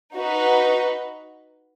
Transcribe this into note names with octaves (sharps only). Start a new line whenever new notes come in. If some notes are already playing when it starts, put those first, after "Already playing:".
D#4 F#4 B4